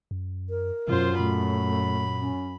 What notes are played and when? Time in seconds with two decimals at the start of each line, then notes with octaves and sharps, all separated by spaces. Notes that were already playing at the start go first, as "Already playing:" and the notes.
0.11 F#2
0.50 A#4
0.88 F#2 B2 F4 C5
1.19 A#2 A3 B5
2.20 C#4